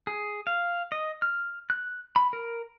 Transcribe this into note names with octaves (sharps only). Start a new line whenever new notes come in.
G#4
F5
D#5
F6
F#6
B5
A#4